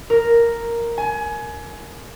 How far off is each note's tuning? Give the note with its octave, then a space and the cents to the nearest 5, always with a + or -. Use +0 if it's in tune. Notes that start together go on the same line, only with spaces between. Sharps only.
A#4 +0
G#5 +25